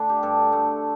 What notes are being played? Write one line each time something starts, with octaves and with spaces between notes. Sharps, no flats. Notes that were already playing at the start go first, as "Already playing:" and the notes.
Already playing: D3 A3 D4
G4
G2 A4
A3